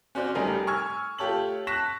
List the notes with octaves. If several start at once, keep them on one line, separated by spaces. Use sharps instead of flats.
C#4 F#4 C5 D5
F1 G3 A3 D#4 A#4 G#5
G#5 C#6 E6 F6 G#6
A3 F4 G4 C#5 A5 F#7
A5 C#6 F#6 A#6 B6 E7